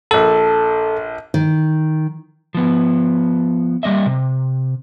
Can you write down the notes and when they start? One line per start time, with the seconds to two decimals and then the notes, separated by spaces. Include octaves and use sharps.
0.11 A#1 A4 A5
1.34 D#3
2.55 F3 B3
3.83 G3 A#3 D#5 E5
4.06 C3